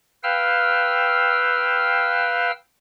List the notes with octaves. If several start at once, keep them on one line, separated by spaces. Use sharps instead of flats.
B4 F5 G5 E6 F6